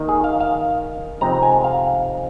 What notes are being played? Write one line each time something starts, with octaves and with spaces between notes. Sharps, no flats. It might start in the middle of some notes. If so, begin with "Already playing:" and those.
Already playing: D#3 A#3 D#4
G#4
F5
F5
F2 C3 G#3 C4 D#4 A#5
G#5
F5